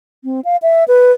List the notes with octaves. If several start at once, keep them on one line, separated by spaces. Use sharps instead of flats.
C4
F5
E5
B4